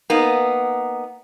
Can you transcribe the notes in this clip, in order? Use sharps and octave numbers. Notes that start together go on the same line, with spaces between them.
A#3 B3 D#4